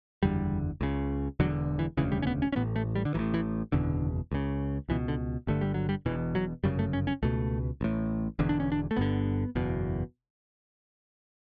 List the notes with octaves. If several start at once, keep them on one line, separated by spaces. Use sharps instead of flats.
F#1 E2 D3 G3
C#2 C#3
E1 E2 D3 F#3
E3
E1 D2 C#3 E3
G3
C#4
B3
C#4
C#4
A1 A2 B3
A3
G3
D3
A1 A2 E3
E3
F#1 E2 B2 D3
C#2 C#3
C#2 B2 E3
D3
G1 G2 D3 A3
G3
F#3
G3
E1 E2 B2 E3
F#3
G1 F#2 C#3 G3
A3
C#4
C#4
C#2 B2 A3
A1 A2
E1 E2 D3
D4
C#4
D4
A3
G1 G2 D3 B3
F#1 E2 B2